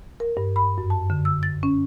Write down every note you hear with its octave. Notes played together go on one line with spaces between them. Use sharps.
A#4
G2
B5
F#2
A5
D3
E6
A6
C#4